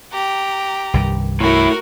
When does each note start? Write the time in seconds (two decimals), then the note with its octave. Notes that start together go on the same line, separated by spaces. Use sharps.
0.12 G4 A#5
0.94 C2 G2 D#3
1.40 A2 E4 F#4 A#4